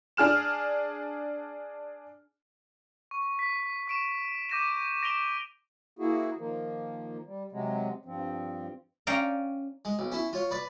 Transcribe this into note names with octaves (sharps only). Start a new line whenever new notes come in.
D4 G#4 F6 E7
C#6
B6
C#6 D7 E7
D6 G6 A#6 D#7 E7
A#6 D7 E7 F7 G7
A#3 E4 F#4 G#4
D#3 F3 A#3
G3
C3 F#3 G#3
G2 F3 C4
C#4 D5 F5 G5 A#5
G#3
B1
C#4 E4
F4 C#5 F5
B4 D5